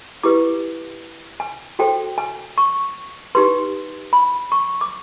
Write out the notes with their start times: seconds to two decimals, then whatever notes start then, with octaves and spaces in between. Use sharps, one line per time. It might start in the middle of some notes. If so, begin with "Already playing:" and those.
0.23 E4 G4 B4 D6
1.40 G#5
1.79 F#4 A4 C5 G5
2.18 G#5
2.58 C#6
3.35 D#4 G4 B4 C6
4.13 B5
4.52 C#6
4.81 D6